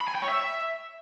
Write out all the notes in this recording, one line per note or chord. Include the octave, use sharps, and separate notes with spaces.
B5
G#5
G5
C#5
E5